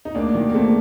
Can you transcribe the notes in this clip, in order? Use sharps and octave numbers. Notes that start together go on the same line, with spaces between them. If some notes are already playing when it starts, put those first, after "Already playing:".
D#4
D2 A#3 D4
D#3
A#3
D2 A3 C4